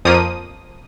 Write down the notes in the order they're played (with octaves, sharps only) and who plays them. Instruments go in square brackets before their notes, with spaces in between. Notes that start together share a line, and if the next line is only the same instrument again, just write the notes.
[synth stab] F2 F3 A#3 D#6